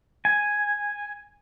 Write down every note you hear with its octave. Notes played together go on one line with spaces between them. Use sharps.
G#5